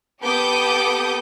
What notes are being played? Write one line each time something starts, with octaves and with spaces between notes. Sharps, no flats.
B3 G4 A4 D6 D#6 G6